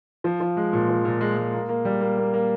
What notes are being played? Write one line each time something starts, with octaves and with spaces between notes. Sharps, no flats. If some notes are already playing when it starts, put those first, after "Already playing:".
F3
F3
G#3
A#2
F3
A#2
G#3
G#3
A#3
A#3
G3
A#3
A#3
A#3